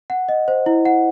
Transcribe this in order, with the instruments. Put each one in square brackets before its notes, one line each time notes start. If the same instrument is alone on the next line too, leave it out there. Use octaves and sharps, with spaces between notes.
[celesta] F#5
D#5
C5
E4
F#5